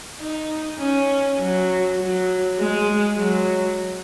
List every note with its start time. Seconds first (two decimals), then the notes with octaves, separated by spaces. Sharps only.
0.20 D#4
0.79 C#4
1.39 F#3
2.00 F#3
2.59 G#3
3.18 F#3